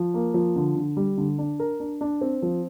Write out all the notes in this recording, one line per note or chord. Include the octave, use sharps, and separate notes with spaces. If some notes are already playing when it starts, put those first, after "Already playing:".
Already playing: F3
A#3
F3
D3
D3
G3
D3
D4
A#4
D4
D4
C4
F3